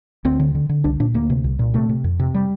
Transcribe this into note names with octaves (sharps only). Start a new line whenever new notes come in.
D2 C4
D3
D3
D3
C2 D4
A#2 D4
D2 A#3
C3
C2
A#2
C3 A3
C3
F2
C3
G3